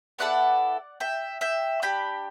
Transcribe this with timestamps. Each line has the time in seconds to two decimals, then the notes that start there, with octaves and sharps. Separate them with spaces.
0.19 B3 E4 A4 D5 F#5
1.00 E5 G5
1.41 E5 G5
1.82 D4 G4 G5 B5